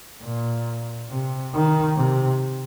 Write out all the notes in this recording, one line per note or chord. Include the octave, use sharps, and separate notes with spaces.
A#2
C3
D#3
C3